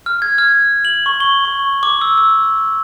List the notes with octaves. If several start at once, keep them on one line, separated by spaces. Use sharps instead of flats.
F6
G#6
F6
F#7
C#6
G7
C#6
D6
E6
E6